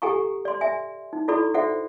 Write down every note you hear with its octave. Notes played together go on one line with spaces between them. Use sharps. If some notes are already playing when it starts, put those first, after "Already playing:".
G4 A4 F#5 G#5 A#5 C#6
D5 C6
D5 E5 G#5
D#4
E4 F#4 A4 D5 B5 C#6
F#4 A4 C5 D5 E5 F#5